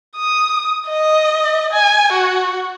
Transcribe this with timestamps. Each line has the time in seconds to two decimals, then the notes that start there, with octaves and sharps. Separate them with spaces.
0.16 D#6
0.87 D#5
1.72 G#5
2.13 F#4